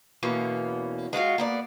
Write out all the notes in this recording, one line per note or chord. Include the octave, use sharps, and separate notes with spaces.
E2 B2 A#3 C#4
G#3 F4 F#4 F5
A#3 B3 D5